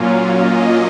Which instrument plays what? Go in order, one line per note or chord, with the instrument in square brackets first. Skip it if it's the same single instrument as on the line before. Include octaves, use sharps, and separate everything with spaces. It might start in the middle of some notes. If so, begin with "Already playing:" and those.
Already playing: [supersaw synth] A#2 F#3 A#3 C#4 F4
D#5